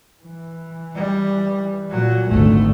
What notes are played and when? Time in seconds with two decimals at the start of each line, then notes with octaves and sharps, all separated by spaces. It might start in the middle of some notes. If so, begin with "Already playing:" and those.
0.22 E3
0.95 G3
1.91 A#2 F#3
2.29 G#1 D2 D3 A3